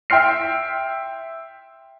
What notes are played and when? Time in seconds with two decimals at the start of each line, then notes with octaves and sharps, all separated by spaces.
0.10 E5 G5 C6 F6 C7